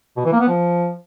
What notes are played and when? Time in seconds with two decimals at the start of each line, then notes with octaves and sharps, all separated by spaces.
0.17 B2
0.25 E3
0.33 A#3
0.40 B3
0.48 F3